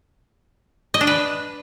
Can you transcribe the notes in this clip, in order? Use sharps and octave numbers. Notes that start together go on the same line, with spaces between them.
D#5
D4
B4